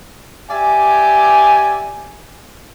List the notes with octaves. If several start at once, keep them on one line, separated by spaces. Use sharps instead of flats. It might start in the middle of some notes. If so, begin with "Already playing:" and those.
G4 D5 E5 G#5